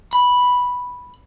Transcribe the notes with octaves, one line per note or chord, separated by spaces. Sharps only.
B5